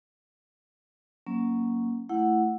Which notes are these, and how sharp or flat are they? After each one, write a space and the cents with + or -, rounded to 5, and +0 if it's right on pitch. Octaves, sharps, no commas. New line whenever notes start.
F#3 +0 A#3 +0 C#4 +0
A3 +5 E4 +10 F#5 +0